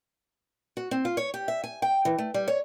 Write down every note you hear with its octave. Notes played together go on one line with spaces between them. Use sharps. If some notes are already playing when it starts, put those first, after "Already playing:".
F#4
C4
F4
C#5
G4
E5
G#5
G5
E3
A3
G3
C#5